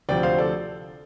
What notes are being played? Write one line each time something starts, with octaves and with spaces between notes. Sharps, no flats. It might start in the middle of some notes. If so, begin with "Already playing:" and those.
D2 C3 F3 D5 G5
C5 F5
A4 D5